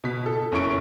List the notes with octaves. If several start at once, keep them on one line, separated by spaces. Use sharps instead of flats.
B2 B6
A4
F#1 C#4 E4 C#6 D7